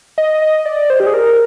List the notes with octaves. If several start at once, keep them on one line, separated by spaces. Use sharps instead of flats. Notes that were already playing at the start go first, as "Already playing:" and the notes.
D#5
D#5
D5
C5
G4
G#4
A#4